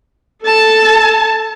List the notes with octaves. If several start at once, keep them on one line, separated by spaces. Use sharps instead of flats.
A4 A5